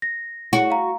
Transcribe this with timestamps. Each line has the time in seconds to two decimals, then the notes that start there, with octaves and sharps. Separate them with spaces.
0.02 A#6
0.53 E4 F#4 G#4 C#5
0.70 F5 A#5